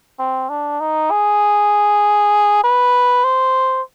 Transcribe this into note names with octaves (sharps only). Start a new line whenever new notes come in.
C4
D4
D#4
G#4
B4
C5